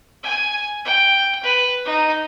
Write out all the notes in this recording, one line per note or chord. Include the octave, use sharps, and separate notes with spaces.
G#5
G5
B4
D#4